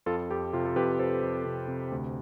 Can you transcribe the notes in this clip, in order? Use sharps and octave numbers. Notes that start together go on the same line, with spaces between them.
F2 F4 A4
F2 G4
C3 F4
A4
F2 G4 B4
F2 A4 C5
F2
C3
C3
D2